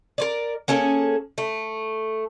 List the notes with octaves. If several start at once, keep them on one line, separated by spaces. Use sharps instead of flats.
A#4 C5 D5
A#3 C#4 G#4 A4
A3